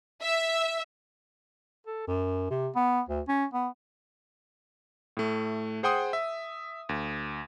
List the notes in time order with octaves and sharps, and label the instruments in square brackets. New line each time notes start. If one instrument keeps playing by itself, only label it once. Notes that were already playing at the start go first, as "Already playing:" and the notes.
[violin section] E5
[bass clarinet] A4
F#2
C3
B3
D2
C#4
B3
[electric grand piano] A2 A3
G#4 C5 F#5 G5 C6 D#6
E5
D2